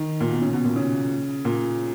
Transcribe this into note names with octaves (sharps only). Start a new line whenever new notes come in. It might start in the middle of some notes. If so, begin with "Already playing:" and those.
Already playing: D#3
A#2
B2
C#3
B2
A#2
C#3
A#2